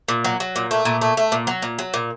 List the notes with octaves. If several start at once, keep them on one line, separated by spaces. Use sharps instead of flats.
A#2
F#3
F#3
A#2
A3
A#2
A3
A3
A#2
F#3
A#2
F#3
A#2